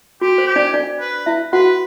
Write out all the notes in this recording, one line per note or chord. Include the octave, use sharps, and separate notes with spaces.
F#4 G4
C5
G4
D4 D5
D4 D5
B4
E4 E5
F#4 B4 F#5